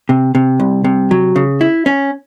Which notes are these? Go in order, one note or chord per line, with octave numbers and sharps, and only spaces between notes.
C3
C3
C2
C3
F#3
C#3
E4
C#4